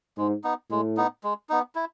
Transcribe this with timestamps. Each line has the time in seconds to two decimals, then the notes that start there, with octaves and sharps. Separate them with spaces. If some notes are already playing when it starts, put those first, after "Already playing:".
0.17 G#2 G#3
0.44 B3 D#4
0.70 A2 G#3
0.97 B3 D#4
1.24 G#3
1.49 B3 D#4
1.75 E4